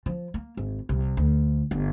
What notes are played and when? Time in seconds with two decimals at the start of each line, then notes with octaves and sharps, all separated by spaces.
0.06 F3
0.34 A#3
0.57 G#1
0.89 C2
1.17 D2
1.71 G1